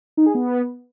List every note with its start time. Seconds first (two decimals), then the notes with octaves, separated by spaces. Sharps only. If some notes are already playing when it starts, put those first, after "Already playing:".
0.17 D#4
0.26 G#4
0.35 B3